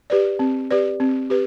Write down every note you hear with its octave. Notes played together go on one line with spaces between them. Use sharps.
G4 B4 D5
C4
G4 B4 D5
C4
G4 B4